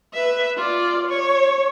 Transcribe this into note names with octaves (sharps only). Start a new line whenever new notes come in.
B4 E5
F4 D5
C#5